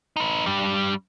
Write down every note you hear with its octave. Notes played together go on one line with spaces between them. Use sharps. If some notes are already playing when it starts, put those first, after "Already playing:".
D#4 B4
G2 G3